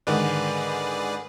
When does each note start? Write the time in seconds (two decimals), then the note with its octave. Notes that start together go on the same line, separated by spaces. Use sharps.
0.07 G#2 D3 D#3 G#4 B4 D5